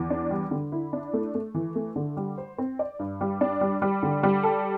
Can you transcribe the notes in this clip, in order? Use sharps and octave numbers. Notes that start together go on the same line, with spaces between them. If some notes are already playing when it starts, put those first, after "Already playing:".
Already playing: E2
D4
G3
D3
E4
D4
A3
A3
E3
A3
D3
G3
C5
C4
D5
G2
G3
D4
G3
G3
D3
G3
A4